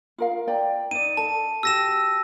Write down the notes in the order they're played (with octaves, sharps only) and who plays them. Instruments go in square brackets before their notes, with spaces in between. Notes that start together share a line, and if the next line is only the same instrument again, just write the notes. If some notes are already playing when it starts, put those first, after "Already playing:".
[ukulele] F4 A#4 F5
D5 G5 A#5
[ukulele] D#4 D5 [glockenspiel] D#7
[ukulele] A4 [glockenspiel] A5
[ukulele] F#4 G4 [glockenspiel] E6 A#6 E7